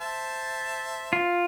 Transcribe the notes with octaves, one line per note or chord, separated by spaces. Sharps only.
C5 E5 A5
F4